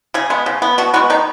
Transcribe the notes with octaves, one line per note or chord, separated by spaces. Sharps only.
C#3 G#4
G#3 B3
C#3
B3
B2 F#4
G#3 B3 F#4
D#3 D#4